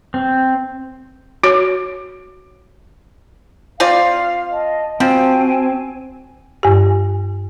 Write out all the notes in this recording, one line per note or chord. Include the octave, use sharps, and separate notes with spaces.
C4
F#4 C#5
C4 F4 D5 F5
D#5 A5
F3 C4 F#4 G#5 A5
G2 G4